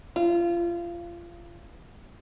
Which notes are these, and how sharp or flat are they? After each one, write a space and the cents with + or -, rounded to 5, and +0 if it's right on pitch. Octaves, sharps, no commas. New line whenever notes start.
F4 -25